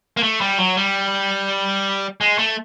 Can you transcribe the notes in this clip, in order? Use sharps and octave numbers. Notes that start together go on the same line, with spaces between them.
A#3
A3
G3
F#3
G3
G#3
A3